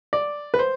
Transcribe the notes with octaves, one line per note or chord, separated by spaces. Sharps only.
D5
B4
C5